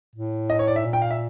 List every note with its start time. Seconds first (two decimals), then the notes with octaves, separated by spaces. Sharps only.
0.16 A2
0.50 D#5
0.59 C#5
0.67 D5
0.76 E5
0.85 A#2
0.93 G5
1.02 F5
1.11 E5